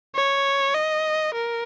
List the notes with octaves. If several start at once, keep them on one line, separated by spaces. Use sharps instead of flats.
C#5
D#5
A#4